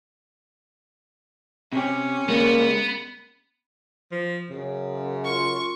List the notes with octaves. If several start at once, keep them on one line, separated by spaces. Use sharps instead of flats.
C3 C#4 G4
C#3 G3 G#3 A#3 B3
F3
F#2 C#3
F4 C6 C#6